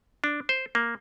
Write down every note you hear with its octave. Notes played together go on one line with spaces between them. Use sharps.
D4
C5
A#3